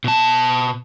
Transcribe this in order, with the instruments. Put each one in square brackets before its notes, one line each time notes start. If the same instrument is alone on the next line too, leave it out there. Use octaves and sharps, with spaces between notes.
[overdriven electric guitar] B2 A5